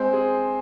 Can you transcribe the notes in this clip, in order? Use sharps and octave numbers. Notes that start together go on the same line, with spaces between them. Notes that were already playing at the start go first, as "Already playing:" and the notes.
Already playing: G#3 C4 C5
G#4